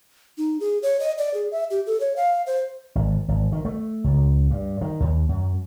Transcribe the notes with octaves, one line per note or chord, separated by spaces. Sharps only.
D#4
G#4
C#5
D#5
D5
G#4
E5
G4
A4
C#5
F5
C5
G#1
G#1
D#3
A3
C#2
G2
D#3
D#2
F#2